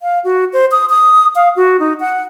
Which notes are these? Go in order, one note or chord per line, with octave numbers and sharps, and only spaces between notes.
F5
F#4
C5
D#6
D#6
F5
F#4
D#4
F#5